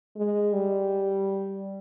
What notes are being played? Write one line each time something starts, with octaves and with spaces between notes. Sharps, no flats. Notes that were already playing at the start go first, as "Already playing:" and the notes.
G#3
G3